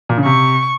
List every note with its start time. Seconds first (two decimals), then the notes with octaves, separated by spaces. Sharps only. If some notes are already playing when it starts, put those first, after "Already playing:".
0.09 A#2
0.18 C#3
0.25 C3 C#6